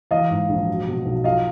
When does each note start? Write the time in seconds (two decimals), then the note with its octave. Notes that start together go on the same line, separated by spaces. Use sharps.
0.11 E3 D#5 F5
0.30 G#2
0.49 A#1
0.67 F#3
0.88 B2
1.05 B1
1.24 F3 D#5 F5